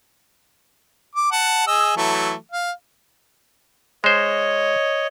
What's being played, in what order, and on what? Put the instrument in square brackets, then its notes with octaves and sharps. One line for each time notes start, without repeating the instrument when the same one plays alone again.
[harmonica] D6
F#5 A5
G#4 D#5 E6
E3 F#3 A3
F5
[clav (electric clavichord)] G#3 C5 [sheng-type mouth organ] C#5 D#5